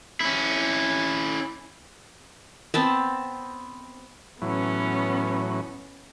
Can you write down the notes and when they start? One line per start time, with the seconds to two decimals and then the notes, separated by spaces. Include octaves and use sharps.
0.21 C#4 E4
2.74 B3 C4 A5
4.42 A2 E3 F#3 B3 C#4